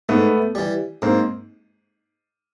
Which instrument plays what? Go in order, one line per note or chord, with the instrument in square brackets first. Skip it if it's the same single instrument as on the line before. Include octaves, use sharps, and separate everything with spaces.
[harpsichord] G#2 [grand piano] A3 B3
[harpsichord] E3 G3
[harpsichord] G#2 [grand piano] A#3 C4